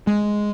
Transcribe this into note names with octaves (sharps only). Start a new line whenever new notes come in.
G#3